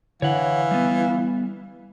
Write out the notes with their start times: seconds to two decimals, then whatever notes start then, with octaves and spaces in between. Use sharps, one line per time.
0.22 D3 E3 C#5 F5 F#5
0.71 G3 B3